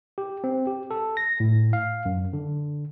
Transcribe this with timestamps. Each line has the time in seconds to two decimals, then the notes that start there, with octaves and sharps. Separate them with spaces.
0.18 G4
0.44 C4
0.67 G4
0.91 A4
1.17 A#6
1.40 A2
1.73 F5
2.05 F#2
2.33 D3